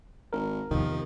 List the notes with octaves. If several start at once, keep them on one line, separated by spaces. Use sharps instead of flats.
G#1 A#4
E2 C3 D#3 F3 G3